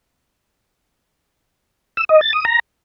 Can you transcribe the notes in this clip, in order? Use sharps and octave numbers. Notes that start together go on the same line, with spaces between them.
E6
D#5
A6
D#6
A#5